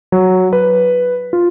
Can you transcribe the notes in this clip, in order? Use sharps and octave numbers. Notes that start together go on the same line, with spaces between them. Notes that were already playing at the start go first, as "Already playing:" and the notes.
F#3
B4
F4